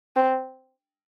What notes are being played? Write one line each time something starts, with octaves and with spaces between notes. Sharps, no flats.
C4